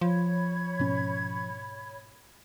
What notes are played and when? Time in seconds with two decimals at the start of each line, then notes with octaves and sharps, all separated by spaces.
0.01 F3 C#5 B5 G#6
0.79 G#2 B2 C#4